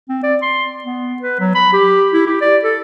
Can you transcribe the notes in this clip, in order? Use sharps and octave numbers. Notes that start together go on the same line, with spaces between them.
C4
D5
C6
B3
B4
F#3
B5
G4
E4
G4
D5
A4